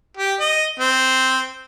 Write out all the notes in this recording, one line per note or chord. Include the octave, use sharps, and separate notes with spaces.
G4
D#5
C4